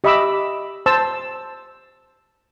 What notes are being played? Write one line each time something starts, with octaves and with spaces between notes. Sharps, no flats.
G4 D#5 E5 B5 D6 E6
C5 A5 E6